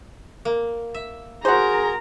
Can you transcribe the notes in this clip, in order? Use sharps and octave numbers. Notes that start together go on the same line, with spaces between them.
A#3
E5
F#4 G#4 A#4 C5 A#5